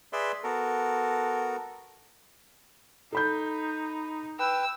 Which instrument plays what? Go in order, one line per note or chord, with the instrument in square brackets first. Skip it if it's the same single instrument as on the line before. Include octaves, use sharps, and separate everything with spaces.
[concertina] G#4 B4 D5 E5 C6
B3 F#4 A4 A#4
[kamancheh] D#4 [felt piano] A4 B5 G6
[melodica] B4 G5 [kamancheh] E6